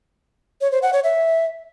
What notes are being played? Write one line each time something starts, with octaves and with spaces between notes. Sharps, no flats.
C#5
C5
F#5
C#5
E5